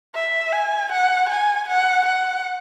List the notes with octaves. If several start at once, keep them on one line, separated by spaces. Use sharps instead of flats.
E5
G#5
F#5
G#5
F#5
F#5